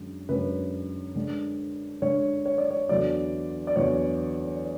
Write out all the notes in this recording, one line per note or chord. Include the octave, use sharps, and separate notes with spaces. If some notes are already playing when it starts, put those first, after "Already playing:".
Already playing: F#2 D3 G#3
F#2 D3 G#3 C#4 B4
D3 G#3 D4
D3 G#3 D4 C#5
C#5
D5
C#5
E2 D3 F#3 A3 D5
D5
E2 D3 F#3 A3 C#5